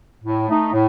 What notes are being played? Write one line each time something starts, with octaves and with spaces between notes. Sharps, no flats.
A2
A3 D#4
A2